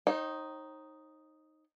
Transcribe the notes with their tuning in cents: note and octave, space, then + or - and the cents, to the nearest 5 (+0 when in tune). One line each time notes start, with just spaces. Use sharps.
D#4 +0 C5 +45 G5 -30